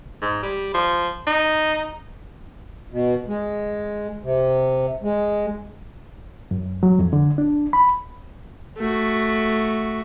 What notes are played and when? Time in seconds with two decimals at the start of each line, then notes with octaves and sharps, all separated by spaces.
0.21 G#2
0.43 G3
0.74 F3
1.27 D#4
2.92 B2
3.28 G#3
4.24 C3
5.03 G#3
6.51 F#2
6.83 F#3
6.99 F2
7.13 D3
7.38 D4
7.73 B5
8.77 A3 F#4